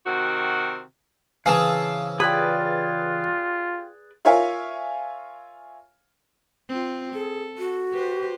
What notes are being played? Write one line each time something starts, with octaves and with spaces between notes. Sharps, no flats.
C3 D#3 C4 F#4
C#3 E3 C4 G#4 C#5 F5 A5
F4 G4 G#4 B4 D5 B5
F4 A#4 C#5 E5 F5 G#5
C4 F4
G#4 A4
F#4
G4 B4 C5